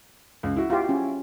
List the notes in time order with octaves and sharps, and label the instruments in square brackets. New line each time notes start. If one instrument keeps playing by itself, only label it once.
[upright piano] C#2
E4 F#4
[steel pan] F4 G4
C#4